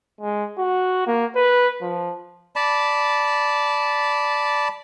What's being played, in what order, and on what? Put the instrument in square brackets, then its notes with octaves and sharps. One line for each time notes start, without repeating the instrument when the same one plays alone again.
[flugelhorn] G#3
F#4
A#3
B4
F3
[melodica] D5 A5 B5